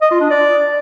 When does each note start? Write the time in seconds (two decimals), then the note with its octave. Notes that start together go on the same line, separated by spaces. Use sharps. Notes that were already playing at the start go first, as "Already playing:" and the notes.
0.01 D#5
0.11 F4
0.21 D4
0.30 D5